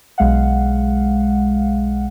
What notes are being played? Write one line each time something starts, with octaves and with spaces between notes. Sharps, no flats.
B1 G#3 F5 F#5